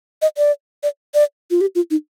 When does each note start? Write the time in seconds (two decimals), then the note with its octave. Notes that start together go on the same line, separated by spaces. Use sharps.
0.22 D#5
0.38 D5
0.83 D5
1.14 D5
1.51 F4
1.61 G4
1.75 F4
1.91 D#4